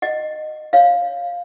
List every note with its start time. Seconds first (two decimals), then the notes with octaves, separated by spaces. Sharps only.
0.02 D#5 F#5
0.73 C#5 F5